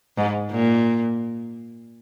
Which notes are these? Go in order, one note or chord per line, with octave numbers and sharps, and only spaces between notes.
G#2
A#2